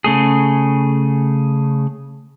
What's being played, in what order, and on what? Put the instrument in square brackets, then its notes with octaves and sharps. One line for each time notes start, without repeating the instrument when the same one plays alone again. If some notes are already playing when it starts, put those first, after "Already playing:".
[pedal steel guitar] C#3 A3 G#4